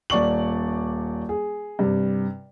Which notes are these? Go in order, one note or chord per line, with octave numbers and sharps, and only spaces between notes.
D#1 D5 C#6 F#7
G#4
G2 C3